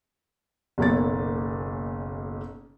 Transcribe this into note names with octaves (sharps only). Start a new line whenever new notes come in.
F#1 B1 A#3 A6